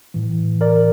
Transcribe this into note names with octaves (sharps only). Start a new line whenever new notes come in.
A2 E3
A#4 D5